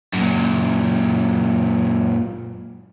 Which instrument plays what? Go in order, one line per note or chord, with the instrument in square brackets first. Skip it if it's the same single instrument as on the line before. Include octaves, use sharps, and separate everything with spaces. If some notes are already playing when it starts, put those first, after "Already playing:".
[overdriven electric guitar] F#2 A#2